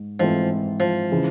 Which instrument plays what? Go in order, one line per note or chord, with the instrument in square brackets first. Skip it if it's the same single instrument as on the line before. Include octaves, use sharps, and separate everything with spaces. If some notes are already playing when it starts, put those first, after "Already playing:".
Already playing: [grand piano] G#2
[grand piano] G#2 E3 A3 C4 [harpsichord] F3
[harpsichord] F3
[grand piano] C#3 E3 G#3